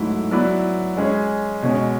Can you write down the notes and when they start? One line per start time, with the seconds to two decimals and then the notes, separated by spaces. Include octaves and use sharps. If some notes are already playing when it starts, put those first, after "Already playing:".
Already playing: G#2 F#3 A3 E4
0.31 F#3 B3 E4 B4 D5
0.97 G#3 C#4 G#4
1.63 B2 G#3 C#4